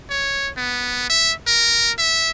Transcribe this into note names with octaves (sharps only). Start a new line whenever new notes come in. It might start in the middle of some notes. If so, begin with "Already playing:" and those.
C#5
B3
E5
A#4
E5